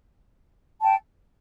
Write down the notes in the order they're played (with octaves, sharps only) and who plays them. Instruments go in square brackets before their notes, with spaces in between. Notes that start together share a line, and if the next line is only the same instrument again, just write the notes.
[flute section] G5 A5